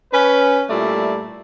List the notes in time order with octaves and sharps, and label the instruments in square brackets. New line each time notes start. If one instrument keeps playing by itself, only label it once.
[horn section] C#4 B4
A#2 G3 A3 E4 D5